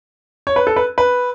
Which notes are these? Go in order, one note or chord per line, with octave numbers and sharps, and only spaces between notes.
C#5
B4
A4
B4
B4